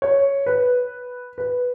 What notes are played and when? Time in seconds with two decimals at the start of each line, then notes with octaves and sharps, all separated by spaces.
0.02 C#5
0.46 B4
1.38 B4